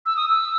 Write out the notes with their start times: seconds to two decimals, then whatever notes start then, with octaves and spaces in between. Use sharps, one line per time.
0.06 E6
0.17 D#6
0.29 E6